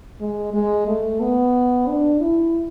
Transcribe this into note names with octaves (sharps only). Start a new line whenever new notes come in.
G#3
G#3
A3
B3
D4
E4